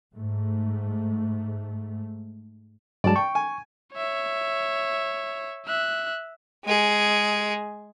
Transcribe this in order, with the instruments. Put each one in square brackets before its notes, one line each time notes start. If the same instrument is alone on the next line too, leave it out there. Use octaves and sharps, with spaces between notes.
[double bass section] G#2 A3
[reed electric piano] G2 F#3 G#3 [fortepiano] D5 A5
[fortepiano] G5 [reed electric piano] C#6
[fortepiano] G#5
[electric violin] C#5 E5
E5 F#6
[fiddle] G#3 G#4